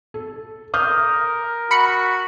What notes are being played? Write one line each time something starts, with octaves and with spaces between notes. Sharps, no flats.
A4
A#4 D#6 F6 G6
F#4 B5 C#7